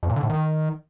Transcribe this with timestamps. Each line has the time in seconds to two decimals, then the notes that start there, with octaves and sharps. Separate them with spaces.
0.03 F2
0.09 A#2
0.16 D3
0.23 A2
0.30 D#3